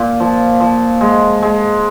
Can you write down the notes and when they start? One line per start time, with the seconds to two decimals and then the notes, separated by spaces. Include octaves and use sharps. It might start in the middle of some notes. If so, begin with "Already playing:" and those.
Already playing: A#2
0.20 F3
0.60 F3
1.01 G#3
1.43 G#3